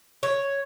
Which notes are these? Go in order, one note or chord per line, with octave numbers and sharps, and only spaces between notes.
C#5